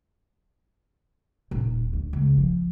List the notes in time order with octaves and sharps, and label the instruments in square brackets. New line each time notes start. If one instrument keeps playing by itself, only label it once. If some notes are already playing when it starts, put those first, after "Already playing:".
[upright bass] D#1
D2
C#2
F3